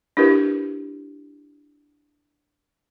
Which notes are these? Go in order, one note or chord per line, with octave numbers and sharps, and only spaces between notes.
D4 E4 G4 A#4 B4